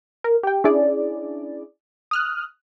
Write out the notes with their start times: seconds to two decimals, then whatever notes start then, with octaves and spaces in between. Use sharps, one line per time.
0.24 A#4
0.43 G4 G5
0.64 C#4 D4 E4 G#4 D5
2.11 D#6 F6 F#6